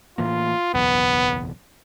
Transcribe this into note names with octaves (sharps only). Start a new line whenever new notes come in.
A2 E3 A#3 F4
F#1 B1 E2 B3